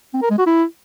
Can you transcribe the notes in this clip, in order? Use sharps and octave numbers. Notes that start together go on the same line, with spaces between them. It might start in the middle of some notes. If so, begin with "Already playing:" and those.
C4
A#4
G#3
F#4
E4